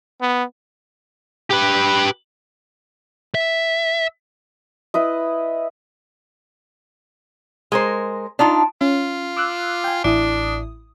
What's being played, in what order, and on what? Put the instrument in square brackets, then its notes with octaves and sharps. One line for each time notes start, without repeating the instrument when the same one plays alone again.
[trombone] B3
[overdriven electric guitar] G4 B4
[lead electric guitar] E5
[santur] E4 B4 D#5
[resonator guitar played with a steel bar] G#3 A#4 C5
D4 D#4 F4
[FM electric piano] C#4 [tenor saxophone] F4
[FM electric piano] D6 E6 F#6
G5 G#5
[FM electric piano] A1 E4 D#6 [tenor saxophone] D4